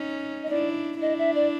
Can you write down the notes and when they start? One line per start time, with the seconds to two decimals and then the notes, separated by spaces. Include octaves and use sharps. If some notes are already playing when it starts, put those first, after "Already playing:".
Already playing: C#4 D#4
0.43 D#5
0.50 D4 E4 D5
1.01 D4 E4 D#5
1.18 E5
1.35 D5